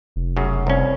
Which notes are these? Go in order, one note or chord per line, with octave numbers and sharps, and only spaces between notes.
F1
F#2 C#3
C2 C#4